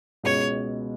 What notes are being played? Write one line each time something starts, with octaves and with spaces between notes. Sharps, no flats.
C#2 B2 G#3 C#5